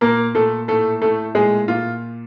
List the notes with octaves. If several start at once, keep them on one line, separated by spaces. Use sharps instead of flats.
A#2 A#3 A#4
A#2 A3 A4
A2 A3 A4
A2 A3 A4
A#2 G#3 G#4
A#2 F4